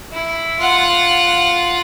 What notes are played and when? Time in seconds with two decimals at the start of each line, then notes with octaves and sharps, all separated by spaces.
0.13 E4
0.59 F4 F#5